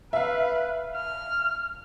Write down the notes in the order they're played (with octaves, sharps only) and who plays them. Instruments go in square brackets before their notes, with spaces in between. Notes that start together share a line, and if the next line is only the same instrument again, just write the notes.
[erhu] B4 [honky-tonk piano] E5 F5
[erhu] F6